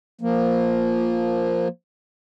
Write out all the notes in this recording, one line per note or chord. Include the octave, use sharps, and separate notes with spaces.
F3 A#3